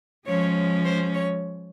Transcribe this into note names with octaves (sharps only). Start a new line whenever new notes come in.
F3 G#3 C#4 C#5
C5
C#5